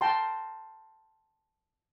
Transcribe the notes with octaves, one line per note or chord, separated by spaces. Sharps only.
G5 A5 A#5 C6